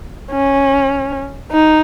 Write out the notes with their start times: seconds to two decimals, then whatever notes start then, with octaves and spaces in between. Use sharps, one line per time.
0.31 C#4
1.51 D#4